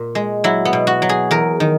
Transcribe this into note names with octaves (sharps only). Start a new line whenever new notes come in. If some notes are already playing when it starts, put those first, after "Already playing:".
Already playing: A#2
G#3
F#3 E4
B3
B2
F#4
F#3
G#4
E2 A#4
D#3